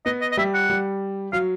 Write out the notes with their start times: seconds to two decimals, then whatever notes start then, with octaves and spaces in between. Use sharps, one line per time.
0.06 B3 D#5
0.21 D#5
0.32 D#5
0.37 G3 E5
0.54 F#5
0.69 G3
1.32 F#3 F5